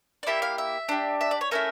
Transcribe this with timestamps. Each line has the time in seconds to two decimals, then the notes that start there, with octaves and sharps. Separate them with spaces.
0.23 D5
0.27 A#3 E4 G4 E5
0.42 F5
0.58 E5
0.89 D4 G4
1.21 E5
1.31 D5
1.41 C#5
1.51 A3 C#4 E4 A#4